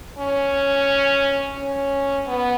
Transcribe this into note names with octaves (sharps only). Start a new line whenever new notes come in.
C#4
C#4
B3